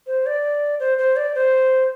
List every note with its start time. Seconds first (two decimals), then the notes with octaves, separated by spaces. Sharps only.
0.07 C5
0.26 D5
0.80 C5
0.98 C5
1.16 D5
1.35 C5